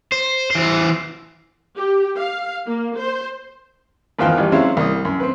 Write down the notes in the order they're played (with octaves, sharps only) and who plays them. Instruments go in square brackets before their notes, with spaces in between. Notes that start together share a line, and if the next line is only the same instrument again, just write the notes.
[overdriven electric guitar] C5
E3 C5
[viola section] G4
F5
A#3
C5
[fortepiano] G#1 E2 F3 F5 G5
A1 G3
F#3 G#3 C4 C#4 E4 F5
C2 D#6
F#2
C4 B4